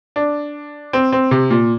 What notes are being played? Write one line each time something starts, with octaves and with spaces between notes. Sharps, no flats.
D4
C4
C4
C3
A#2